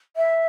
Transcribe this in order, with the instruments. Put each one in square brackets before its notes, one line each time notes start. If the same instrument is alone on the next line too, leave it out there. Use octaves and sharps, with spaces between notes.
[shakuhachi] E5